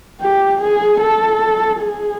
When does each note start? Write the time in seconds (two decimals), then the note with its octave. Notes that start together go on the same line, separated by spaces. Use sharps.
0.21 G4
0.61 G#4
1.01 A4
1.79 G#4